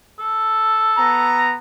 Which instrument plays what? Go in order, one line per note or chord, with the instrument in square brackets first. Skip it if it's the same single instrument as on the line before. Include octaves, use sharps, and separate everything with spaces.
[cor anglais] A4
[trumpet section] B3 A#5